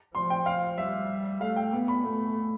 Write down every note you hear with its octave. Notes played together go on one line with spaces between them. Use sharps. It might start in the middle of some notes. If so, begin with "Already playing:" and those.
F3 C6
G5
F5
G3 E5
A3 F5
G5
B3
B5
A3